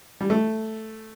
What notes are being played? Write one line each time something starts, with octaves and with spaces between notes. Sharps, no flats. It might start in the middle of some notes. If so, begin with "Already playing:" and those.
G3
A3